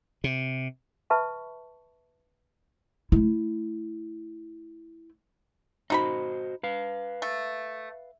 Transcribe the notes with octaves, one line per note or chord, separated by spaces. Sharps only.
C3
B4 E5 A5 B5 C#6
A3 E4
D#4 F#4 C5 D#5 A#5 B5
B4 F5
A3